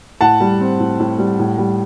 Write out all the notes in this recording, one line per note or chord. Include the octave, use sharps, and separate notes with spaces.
A2 F#5 A5
G3
C4
A2
A2
G3
A2
G3